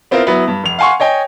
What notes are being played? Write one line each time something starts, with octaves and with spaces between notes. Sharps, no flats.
B3 C4 E4 F4 A#4
F#3 B3 E4
G2
F1 F7
F5 F#5 G#5 C6 C#6
C#5 D#5 G5 G#5